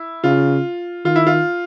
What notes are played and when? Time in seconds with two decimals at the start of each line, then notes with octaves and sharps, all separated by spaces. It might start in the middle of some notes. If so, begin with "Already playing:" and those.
Already playing: E4
0.24 C#3 F4
1.05 D#3 F4
1.16 E4
1.27 F4